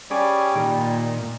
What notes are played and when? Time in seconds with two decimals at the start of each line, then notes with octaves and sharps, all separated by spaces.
0.11 G3 C#4 G#4 D5
0.55 A#2 D#3